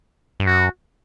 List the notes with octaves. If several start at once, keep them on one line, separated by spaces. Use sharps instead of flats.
G2
F#2 F#4